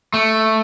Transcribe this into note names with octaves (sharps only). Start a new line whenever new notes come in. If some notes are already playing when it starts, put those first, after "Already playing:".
A3